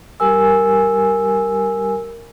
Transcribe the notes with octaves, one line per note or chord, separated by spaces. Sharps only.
G3 G4 A#4 G#5 E6